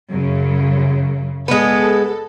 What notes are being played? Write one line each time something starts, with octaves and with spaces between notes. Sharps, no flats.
F#2 C#3
G#3 B3 A4